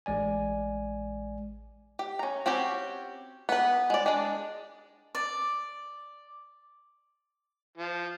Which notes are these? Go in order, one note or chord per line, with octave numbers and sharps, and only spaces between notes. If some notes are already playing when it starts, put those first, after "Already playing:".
A1 G#3 D5 G#5
G4
C#4 A#5
C4 C#4 F#4 G4
B3 B4
G#3 D5
G#3 D4
D5
F3